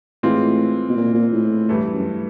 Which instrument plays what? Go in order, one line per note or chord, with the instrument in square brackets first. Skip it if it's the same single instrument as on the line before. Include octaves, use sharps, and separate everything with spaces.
[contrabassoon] A2 [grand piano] E3 G#3 C4 F4
[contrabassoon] B2
A#2
A#2
A2
[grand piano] G2 E3 A3
[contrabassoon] F#2